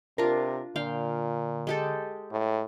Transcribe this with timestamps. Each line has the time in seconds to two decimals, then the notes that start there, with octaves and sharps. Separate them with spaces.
0.18 C3 D4 F4 A#4
0.76 A#2 D3 F5 G5
1.67 G#3 G4 A4
2.31 A2